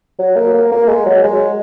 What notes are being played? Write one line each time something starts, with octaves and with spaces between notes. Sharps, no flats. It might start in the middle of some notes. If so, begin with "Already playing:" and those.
F#3
A#3
A#3
A#3
G#3
F#3
G#3